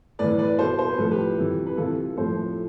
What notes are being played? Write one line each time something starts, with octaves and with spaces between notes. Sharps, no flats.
A2 E3 B4 D5
B4 D5
B2 A4 C5
C5
B4
A2 F3 A4
G4 B4
C3 E3
B4
C3 E3 F4 A4
A2 F3 A4 C5